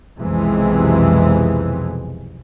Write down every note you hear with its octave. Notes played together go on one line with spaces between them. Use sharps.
B1 F2 C3 E3 G#3